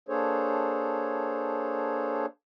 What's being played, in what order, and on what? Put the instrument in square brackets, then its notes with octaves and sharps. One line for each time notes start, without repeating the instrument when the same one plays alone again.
[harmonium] A#3 D4 G#4 A4 C5 C#5